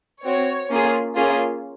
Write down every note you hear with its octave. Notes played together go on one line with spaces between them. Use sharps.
C4 F#4 C#5
A#3 C#4 F4 G#4
A#3 C#4 F4 G#4